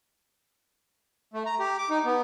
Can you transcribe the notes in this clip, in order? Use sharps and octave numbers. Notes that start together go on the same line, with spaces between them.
A3
A#5
G4
D6
D#4
B3